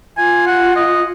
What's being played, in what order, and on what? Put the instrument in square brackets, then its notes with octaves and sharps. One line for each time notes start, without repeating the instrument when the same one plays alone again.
[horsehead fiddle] F4 [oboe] G#5
[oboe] F#5
D#5